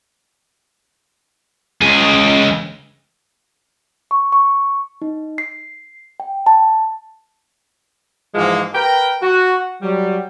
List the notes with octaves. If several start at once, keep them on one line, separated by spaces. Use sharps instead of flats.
C#2 G#4
C#6
C#6
D#4
C7
G5
A5
G#2 E3 F3 G#3 A#3
A#4 B4 G5
F#4
F#3 G3